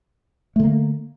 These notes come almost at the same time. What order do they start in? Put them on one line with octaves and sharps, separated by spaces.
A3 D3 A#3